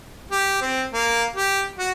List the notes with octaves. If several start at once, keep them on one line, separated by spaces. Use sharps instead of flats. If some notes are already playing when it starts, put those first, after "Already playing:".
G4
C4
A#3
G4
F#4